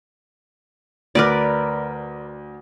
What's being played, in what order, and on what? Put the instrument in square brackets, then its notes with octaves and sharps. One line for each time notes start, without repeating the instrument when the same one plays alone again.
[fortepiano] D2 D6 [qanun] A#4 B4 D5